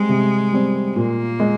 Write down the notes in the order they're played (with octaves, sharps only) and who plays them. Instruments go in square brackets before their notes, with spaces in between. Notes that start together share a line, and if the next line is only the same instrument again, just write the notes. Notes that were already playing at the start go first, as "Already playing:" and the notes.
Already playing: [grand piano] G3 C4 [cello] G#3
[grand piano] C3
G3 C4
[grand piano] A#2 [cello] A#3
[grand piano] G#3